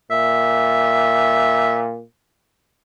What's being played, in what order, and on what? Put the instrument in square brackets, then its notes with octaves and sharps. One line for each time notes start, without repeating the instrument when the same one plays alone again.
[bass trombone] A#2 [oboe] E5